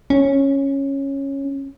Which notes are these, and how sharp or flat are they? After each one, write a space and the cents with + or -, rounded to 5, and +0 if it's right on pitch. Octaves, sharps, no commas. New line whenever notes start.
C#4 -10